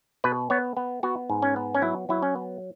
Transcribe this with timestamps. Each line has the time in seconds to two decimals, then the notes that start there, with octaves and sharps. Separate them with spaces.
0.24 B2 B4
0.50 B3 C#5
0.77 B3
1.03 B3 F#4
1.30 G#2
1.42 C#4
1.56 B3
1.75 C#4
1.82 F#3 E4
2.09 F#3 E4
2.23 C#4
2.36 B3